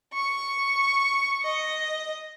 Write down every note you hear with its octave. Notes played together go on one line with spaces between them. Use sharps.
C#6
D#5